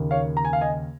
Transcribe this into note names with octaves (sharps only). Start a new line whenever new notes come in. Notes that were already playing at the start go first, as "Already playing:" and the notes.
Already playing: D#2 C#3 A#3
C#5 F5
A#5
G#5
F5
D#5 G#5